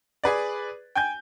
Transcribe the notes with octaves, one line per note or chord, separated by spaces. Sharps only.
G#4 B4 D5
G5 G#5 G6